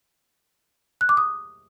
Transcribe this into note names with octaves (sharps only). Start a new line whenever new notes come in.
F#6
D6
D#6